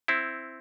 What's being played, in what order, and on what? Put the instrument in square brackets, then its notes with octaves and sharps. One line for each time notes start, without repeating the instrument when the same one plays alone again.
[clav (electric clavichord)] C4 E4